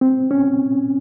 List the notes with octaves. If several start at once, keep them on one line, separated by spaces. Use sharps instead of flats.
C4
C#4